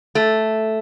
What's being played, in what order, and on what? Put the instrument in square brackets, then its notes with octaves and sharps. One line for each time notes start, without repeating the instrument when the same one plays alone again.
[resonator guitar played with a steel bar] A3